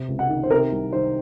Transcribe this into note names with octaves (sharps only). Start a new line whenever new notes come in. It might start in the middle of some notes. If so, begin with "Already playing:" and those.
Already playing: C3
C#2
F#5
D#3
C5
C3 A#4
C2
D#3 C5